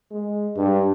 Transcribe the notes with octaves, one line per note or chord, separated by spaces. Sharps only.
G#3
G2